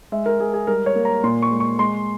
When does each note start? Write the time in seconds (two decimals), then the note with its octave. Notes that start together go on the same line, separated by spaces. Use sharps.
0.12 G#3 E5
0.26 A#4
0.40 G#3 G#4
0.54 G#4
0.67 G3 A#4
0.86 C#5
0.95 A#3
1.05 A#5
1.23 A#2 C6
1.42 C#6
1.51 G#3
1.60 C#6
1.79 G#3 C6